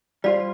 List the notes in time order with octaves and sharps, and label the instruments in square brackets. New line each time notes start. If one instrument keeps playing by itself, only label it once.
[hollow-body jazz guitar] G3 F4 C5 [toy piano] D5